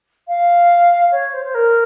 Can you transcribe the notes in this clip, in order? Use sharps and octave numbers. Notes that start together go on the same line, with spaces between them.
F5
C#5
C5
C5
A#4